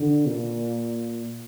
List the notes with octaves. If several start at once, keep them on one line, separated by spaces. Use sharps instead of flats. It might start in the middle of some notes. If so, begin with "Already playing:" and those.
Already playing: D3
A#2